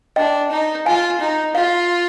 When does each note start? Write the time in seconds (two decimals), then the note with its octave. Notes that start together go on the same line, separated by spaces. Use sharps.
0.16 D4 D#5 G5
0.51 D#4
0.86 F4 F5 G#5
1.20 D#4
1.55 F4 F5